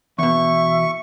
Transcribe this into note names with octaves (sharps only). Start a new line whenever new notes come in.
E2 B2 E5 C#6